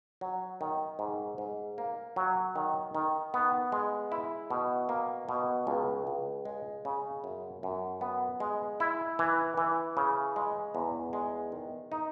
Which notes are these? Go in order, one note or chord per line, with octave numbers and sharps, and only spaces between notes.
F#3
D#3
G#2
G#2
A#3
F#3
D#3
D#3
B3
G#3
E4
B2
A#3
B2
C#2
C#2
G#3
C#3
F#2
F#2
B3
G#3
E4
E3
E3
C#3
G#3
E2
G#3
D#3
D#4